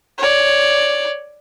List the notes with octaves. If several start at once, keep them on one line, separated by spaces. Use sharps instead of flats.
C#5 D5